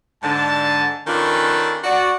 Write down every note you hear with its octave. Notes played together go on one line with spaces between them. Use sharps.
G#2 D3 A5
D#3 C#4 D4 F4 A4 B4
F#4 D5